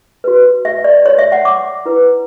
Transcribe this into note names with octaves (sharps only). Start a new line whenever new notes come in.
F#4 B4
E5
D5
C#5
E5
F#5
D6
E4 B4